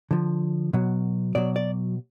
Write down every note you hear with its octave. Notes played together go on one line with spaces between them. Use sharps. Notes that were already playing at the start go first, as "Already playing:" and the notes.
D3 F3
B2 F#3
B2 F#3 D5
D5